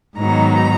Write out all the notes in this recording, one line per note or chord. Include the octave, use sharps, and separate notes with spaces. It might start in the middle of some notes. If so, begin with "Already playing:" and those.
G#2 D#3 F#3 B3 D#4 A#5